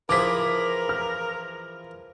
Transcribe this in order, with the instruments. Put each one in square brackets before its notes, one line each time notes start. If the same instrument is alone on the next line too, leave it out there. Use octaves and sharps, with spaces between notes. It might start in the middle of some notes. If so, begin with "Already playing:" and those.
[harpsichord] E3 F3 G#4 [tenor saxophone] A#4 [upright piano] D6 B6
[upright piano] F6